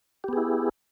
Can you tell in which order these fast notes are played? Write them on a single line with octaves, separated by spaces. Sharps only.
G4 B3 G#4 E4